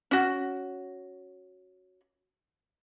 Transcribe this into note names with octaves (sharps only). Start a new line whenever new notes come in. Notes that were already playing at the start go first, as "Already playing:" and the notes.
C#4 F#4